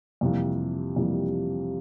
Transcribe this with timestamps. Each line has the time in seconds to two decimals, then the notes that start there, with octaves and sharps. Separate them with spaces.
0.21 F2 C3 E3 G3 A#3
0.96 F2 C3 E3 G3 A#3